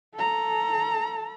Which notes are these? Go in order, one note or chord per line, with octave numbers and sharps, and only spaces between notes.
A4 A#5